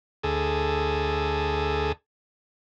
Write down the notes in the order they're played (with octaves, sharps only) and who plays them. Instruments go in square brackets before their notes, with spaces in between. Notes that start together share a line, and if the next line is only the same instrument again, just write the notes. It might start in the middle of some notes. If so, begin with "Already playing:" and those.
[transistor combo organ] D2 G#4 A4